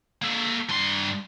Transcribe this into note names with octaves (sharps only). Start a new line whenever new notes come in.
A#3 A4
G2 C6